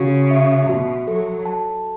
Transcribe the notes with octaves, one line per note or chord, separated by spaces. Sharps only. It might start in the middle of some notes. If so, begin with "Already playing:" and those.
Already playing: C#3 F#4
E5
B2 F#4
F#3 A4
A5